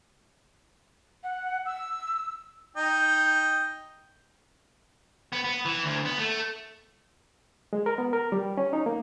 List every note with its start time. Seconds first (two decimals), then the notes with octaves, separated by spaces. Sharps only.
1.23 F#5
1.66 E6
2.77 D#4 D#5 G5
5.32 B3
5.44 B3
5.65 E3
5.85 D2
6.05 B3
6.18 A3
7.73 G#3
7.86 A#4
7.98 B3
8.13 A#4
8.32 G3
8.57 C#4
8.73 D#4
8.86 A#3